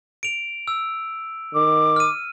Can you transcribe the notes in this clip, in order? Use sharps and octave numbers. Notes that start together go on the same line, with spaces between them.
D7 F7
E6
D#3 D6
F6 D#7